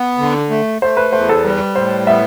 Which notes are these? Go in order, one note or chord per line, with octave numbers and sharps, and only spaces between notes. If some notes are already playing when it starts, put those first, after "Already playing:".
Already playing: B3
D3
A3
A3 C5
B4
E2 C5
A4
G3 B4
A2 C5
B3 E5